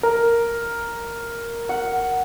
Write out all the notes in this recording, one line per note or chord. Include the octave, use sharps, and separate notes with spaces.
A#4
F#5